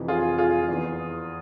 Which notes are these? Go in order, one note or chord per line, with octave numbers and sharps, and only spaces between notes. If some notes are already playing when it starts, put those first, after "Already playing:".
Already playing: F2 C3 E3
F4 G#4
F4 G#4
E2 E3